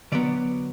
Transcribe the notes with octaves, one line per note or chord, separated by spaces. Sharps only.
D3 F#3 B3 D5